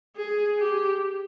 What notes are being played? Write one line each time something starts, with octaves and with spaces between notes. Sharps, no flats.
G#4
G4